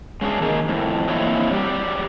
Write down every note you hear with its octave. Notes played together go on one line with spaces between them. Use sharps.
G#3 C#4 D4 G#4
D#3 A#3 G#4
F2 A2
A#3 C4 E4 F#4 C#5 D#5
F#3 G3 G4